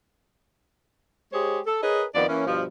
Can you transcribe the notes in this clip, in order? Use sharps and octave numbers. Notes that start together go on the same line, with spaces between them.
G#3 G4 G#4 C5 C#5
A4
G#4 A#4 B4 C#5 D#5
F2 D#3 B3 D5
E3 A#3 C#4
G2 B2 F3